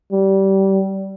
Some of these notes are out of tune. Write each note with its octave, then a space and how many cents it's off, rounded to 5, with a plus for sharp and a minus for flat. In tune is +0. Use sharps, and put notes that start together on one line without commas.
G3 -20